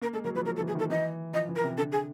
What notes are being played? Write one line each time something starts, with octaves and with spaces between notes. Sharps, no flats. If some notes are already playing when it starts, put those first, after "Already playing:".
A#3 A#4
G#3 A4
F#3 A#4
F3 B4
F3 A#4
A4
E3
G#4
D#3 A4
E3 D#5
F3 D#5
E3
A#4
C3
D3 A4
G#4